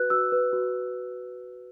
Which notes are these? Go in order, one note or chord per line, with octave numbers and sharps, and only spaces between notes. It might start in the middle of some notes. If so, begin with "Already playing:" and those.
Already playing: F#4 B4 F#6
F#4 E6
B4
F#4